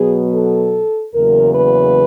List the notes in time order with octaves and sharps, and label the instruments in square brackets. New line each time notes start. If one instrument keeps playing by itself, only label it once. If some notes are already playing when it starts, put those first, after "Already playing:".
Already playing: [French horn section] B2 F#3 B3 G#4
A4
E2 C#3 F#3 A#3 A#4
B4